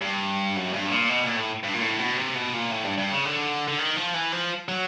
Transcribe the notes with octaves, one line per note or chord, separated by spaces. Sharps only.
G2
F#2
G2
A2
A#2
B2
A#2
A2
G2
A#2
A2
B2
C3
B2
A#2
A2
G2
G2
C#3
D3
D3
D#3
F3
E3
F3
F#3